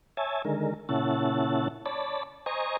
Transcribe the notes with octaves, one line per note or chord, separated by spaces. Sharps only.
C#5 E5 G#5 A5
D3 D#3 G#3 A#4
A#2 C#3 C#4 E4 F#5 A5
C#5 D5 A5 B5
C5 D#5 G#5 A#5 C#6